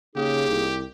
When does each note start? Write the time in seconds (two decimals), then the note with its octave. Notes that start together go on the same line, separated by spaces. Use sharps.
0.16 C#3 A#3 D#4 G4 G#4
0.49 C2